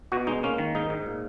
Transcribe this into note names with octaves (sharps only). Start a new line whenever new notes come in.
B2 F#4
G#3 D#4
A#3 C#4
D#3
G#2 D#4
G#2
A#2